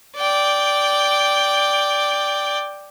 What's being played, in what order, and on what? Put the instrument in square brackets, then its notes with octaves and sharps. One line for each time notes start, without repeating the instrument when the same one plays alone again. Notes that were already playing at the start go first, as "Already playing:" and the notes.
[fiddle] D5 G5